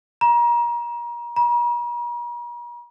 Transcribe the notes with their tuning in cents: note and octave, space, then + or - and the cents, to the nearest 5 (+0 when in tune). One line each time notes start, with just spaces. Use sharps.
A#5 +30
A#5 +45